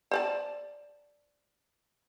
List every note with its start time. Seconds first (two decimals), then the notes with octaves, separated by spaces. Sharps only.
0.11 C5 D5 A5